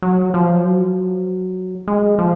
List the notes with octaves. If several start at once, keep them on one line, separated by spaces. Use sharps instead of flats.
F#3
F3
F#3
G#3
F3